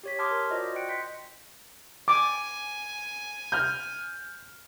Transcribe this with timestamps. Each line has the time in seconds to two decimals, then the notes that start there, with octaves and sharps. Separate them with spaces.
0.03 G4 C#5 B6
0.19 A5 C6 D6 D#6 F6 G#6
0.31 A#4
0.50 F4 F#4 C5 D5 D#5
0.76 G5 F#6 C#7 D7
0.89 D#5 C6 G6 B6 C#7
2.08 G#5 D6
3.52 F6 G6